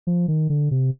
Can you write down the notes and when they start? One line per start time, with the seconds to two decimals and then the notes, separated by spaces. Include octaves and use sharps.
0.07 F3
0.28 D#3
0.50 D3
0.71 C3